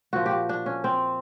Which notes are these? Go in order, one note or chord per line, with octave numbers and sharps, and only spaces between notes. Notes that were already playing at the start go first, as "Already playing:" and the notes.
A#2 F3 F#4
G4
F#4
D4
C#4
C4